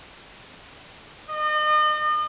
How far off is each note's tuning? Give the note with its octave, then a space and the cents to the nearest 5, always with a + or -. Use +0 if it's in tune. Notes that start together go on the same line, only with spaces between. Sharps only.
D#5 -40